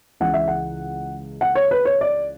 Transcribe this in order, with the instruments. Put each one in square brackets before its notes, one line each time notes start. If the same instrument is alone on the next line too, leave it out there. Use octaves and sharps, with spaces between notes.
[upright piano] C#2 C#3 E3 F#5
E5
F#5
F#5
C#5
B4
C#5
D5